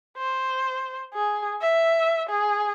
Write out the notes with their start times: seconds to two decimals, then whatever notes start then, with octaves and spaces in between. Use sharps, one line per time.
0.17 C5
1.14 G#4
1.62 E5
2.30 G#4